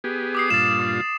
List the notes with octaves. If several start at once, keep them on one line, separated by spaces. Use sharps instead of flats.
B3 G4 G#4
D6 D#6 C7
G2 A#2 F4 A6 E7
D6